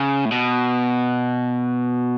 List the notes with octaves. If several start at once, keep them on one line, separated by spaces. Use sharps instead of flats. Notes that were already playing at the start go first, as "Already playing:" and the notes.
Already playing: C#3
A2
B2